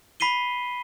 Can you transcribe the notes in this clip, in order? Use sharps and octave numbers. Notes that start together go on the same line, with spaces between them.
B5 B6 C7 D#7 G7